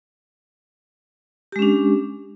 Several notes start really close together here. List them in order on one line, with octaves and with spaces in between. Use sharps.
G4 G#3 C#4 D4